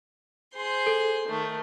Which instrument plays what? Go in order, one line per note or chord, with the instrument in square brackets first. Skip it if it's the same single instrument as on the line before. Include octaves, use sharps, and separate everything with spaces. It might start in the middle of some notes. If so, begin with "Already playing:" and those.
[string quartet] G#4 C5 C6
[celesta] A4
[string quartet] D#3 A3